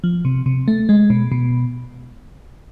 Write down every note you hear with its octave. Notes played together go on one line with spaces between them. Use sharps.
F3
C3
C3
A3
G#3
B2
B2